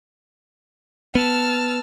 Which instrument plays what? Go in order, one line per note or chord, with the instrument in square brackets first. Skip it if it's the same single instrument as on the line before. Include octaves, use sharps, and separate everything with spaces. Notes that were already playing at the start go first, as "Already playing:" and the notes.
[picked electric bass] B3 [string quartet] A5 E6 F6